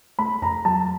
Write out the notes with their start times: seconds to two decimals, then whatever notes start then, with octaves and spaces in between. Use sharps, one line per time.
0.19 A3 B5
0.42 F2 A#5
0.65 F#3 A5